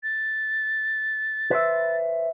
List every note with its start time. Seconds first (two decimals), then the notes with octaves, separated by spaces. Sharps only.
0.03 A6
1.51 B4 C5 E5